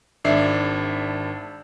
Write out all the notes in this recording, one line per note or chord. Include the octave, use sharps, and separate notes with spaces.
G#1 D4 E5 C7